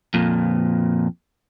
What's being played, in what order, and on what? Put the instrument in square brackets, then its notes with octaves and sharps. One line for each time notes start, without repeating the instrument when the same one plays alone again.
[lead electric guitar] F2 A#2